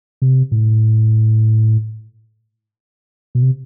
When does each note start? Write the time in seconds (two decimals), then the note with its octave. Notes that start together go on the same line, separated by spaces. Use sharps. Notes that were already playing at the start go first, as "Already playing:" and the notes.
0.22 C3
0.52 A2
3.35 B2
3.42 C3